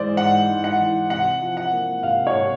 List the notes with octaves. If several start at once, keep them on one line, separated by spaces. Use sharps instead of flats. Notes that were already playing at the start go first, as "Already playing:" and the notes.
Already playing: G#2 E3 G#3 C5 D5
G#2 F#5
G#2
F#5
E3
C3 F#5
F3
F#5
A#3
C3 F5
C#5
C3